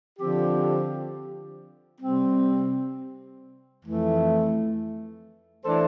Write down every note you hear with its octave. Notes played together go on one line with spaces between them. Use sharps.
D3 F3 C4 G4
C3 G3 C4
F2 E3 A3
E3 A3 D4 A4 C5